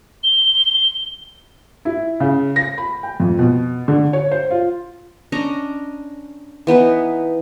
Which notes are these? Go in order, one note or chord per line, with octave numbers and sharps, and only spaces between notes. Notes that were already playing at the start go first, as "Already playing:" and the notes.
G7
E4
C#3
A#6
B5
G5
F2
B2
D3
C#5
C5
F4
C#4 D4 D#5 A#5
E3 B3 D#4 B4